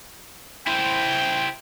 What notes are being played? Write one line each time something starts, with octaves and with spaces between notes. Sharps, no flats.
E4 C5 G5